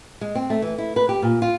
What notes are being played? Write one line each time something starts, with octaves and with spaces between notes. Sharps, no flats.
G#3
C4
A3
E3
E4
B4
G4
A#2
F4